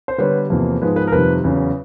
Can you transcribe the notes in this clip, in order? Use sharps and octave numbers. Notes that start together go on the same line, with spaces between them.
C5
D3 G3 B3 B4 C#5
E2 C3 F3 A#3
G#2 F3 G#3 B3 B4
B4
A#4
F2 C3 D#3 G3 B4
E2 C#3 F#3